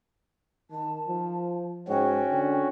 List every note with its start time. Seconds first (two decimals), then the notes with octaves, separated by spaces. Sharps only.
0.71 D#3 A5
1.08 F3
1.88 G#2 C#4 F#4 G5
2.30 D3